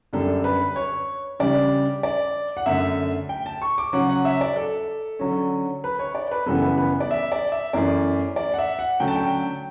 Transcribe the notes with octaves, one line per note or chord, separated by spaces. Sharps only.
F#2 D3 G3 D4 A4
B4
C#5
C#3 G3 D4 D5
D5
F#5
F#2 D3 A3 E5
G5
A5
C#6
D6
C#3 F#3 C#4 F#5
F#5
E5
D5
A4
D3 F#3 C#4
B4
C#5
D5
B4
F#2 C#3 E3 G3 B3 A4
B4
B4
D5
E5
D5
E5
F#2 E3 A3 C#4 D5
D5
F#5
E5
F#5
D3 F#3 A3 C#4 G5
A5
G5